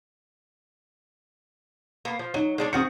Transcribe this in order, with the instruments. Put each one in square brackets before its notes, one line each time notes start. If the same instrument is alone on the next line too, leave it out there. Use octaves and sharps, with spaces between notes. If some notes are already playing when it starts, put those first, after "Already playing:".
[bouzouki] A#3 B3
F3
[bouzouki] F#3 [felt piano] D#4
[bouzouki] G#3 D4 C#5
[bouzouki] D#3 F#4 G#4 [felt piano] C4 C#7